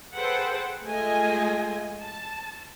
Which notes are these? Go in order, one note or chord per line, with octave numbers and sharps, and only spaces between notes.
G#4 A4 B4 C5 F#5 G5
G#3 A3 F4 D#5 G#5
A5